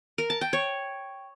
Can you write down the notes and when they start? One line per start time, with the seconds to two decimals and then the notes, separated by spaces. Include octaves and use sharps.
0.18 A#4
0.30 A5
0.41 G5
0.53 C#5